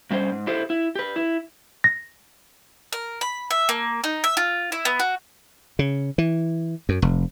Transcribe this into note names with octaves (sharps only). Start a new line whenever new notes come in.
G2 G3 C#4 C5
G#2
E4 G4 A4 C5
E4
G4 B4
E4
A#6
A#4
B5
E5
A#3
D#4
E5
F4
E4
B3
F#4
C#3
E3
F#2
F1